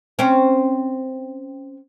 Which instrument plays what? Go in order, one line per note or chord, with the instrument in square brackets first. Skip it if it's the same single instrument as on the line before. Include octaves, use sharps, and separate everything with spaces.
[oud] C4 C#4